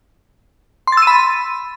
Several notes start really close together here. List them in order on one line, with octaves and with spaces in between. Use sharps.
C6 A6 E6 D#7 B5